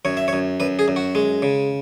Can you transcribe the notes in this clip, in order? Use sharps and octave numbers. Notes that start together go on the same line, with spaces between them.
F#2 C#5
E5
C#5
F#2
F#2 B4
G#4
F#2
F#4
G#3
C#3